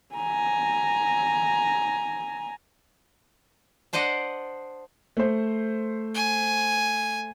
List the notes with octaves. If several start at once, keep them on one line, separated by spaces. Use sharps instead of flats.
G#5 A#5
D4 C5 D5 D#5 F#5
A3 C5
G#5